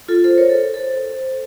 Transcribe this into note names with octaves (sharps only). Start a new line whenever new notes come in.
F4 A4
A4 C5
A#4 C#5
A4 C5
A4 C5